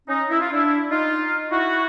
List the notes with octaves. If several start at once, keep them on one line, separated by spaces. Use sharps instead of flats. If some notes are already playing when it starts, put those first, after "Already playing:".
C#4 D#4
E4
F4
D4 E4
D#4 F4
E4 F#4